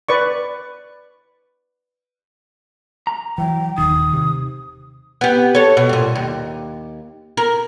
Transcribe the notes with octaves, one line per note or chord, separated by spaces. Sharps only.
B4 D5 C#6
A#5
E3 F#3 G5
D#1 D#3 D#6
C3
B3 G4
A4 C#5
B2
G2 A#2
D#2
A#4